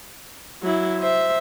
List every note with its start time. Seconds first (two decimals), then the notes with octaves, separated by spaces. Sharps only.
0.63 F#3 E4
0.99 C5 E5